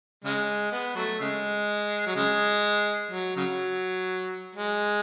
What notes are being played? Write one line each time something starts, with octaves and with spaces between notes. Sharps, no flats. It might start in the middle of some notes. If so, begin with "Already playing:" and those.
C#3 G#3
B3
F#3 A3
C#3 G#3
F#3
C#3 G#3
F#3
C#3 F#3
G#3